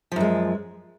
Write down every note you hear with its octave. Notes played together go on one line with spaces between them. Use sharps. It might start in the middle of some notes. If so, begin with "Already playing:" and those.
F#2 F3 G#3